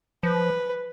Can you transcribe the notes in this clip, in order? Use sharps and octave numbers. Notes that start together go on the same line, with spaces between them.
F3 B4